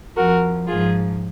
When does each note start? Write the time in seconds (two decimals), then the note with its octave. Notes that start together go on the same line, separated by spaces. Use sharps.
0.15 F2 F3 F#4 A#4
0.67 G#2 F3 F4 G#4